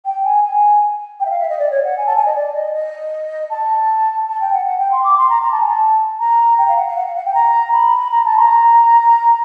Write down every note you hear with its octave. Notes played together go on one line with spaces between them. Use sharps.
G5
G#5
G#5
G5
E5
F5
E5
D#5
D5
C#5
F#5
G#5
A5
G#5
D#5
D5
D#5
D#5
A5
A5
G5
F#5
F#5
G5
C6
D6
C6
A#5
A#5
A5
G#5
A5
A#5
G5
F5
F#5
F5
F#5
F5
F#5
G5
A#5
B5
A#5
A5
C6
A#5